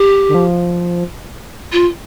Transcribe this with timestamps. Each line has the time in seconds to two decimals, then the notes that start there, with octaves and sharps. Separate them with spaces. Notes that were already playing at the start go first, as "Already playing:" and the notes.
Already playing: G4
0.29 D3
0.35 F3
1.72 F4